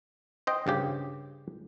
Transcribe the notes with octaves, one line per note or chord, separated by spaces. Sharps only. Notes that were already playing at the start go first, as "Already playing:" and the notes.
C5 D#5 G5
G2 C#3 G4